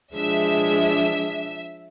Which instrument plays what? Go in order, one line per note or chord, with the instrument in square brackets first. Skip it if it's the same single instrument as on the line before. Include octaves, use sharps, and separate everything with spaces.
[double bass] F3 D4 [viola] G#3 [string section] E5